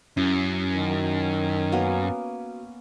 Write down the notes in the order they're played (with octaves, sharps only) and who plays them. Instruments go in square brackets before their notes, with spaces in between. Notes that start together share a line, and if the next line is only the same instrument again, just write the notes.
[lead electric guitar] F#2 [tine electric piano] C#4 [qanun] E4
[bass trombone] D#3
[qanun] A#3 B3 C#4 [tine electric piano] F#4